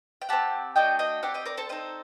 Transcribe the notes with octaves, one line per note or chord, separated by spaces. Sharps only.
G5
C4 G4 F#5 A5
A3 D4 F#4 D#5 G5
D#5 G5
C4 G4 D5 F#5
D#5 G5
A#4 D5
A4 C5
C4 D#4 A4 C5 D#5